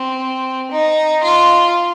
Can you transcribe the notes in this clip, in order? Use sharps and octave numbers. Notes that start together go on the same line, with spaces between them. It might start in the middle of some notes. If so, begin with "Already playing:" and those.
Already playing: C4
D#4
F4